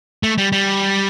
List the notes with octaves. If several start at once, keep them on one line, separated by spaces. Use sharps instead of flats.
A3
G3
G3